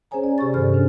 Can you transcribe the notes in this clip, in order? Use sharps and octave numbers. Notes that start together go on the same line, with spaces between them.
C#4 G#4 C5 C#5 G#5 A#5
C5 D5
C3 G4 D5 C#6 A6
G2 D#3 A4 C5 D5 F6
C#4 D4